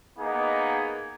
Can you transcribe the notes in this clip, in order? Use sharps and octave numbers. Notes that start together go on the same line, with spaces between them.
A#3 B3 D#4 G#4